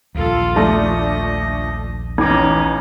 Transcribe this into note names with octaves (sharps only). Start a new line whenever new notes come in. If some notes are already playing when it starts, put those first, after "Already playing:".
A#1 D#2 F4 A4
F3 A3 D4 D#5
A1 C#4 D#4 D6